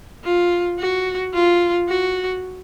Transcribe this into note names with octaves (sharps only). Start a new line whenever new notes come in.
F4
F#4
F4
F#4